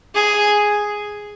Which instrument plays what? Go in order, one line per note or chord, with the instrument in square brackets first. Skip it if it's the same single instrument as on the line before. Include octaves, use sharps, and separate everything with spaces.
[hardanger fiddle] G#4